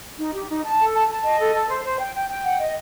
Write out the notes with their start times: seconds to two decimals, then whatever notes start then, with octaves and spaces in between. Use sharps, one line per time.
0.19 D#4
0.34 G4
0.49 D#4
0.64 A5
0.79 A4
0.94 A5
1.09 A5
1.24 D#5
1.39 A4
1.54 A4
1.69 C5
1.84 C5
2.00 G5
2.14 G5
2.29 G5
2.45 F#5
2.59 D#5